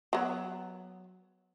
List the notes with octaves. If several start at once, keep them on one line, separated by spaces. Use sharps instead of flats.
F#3 B3